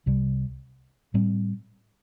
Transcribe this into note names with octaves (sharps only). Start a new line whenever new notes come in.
C2 C3 G3
A2 G3 C4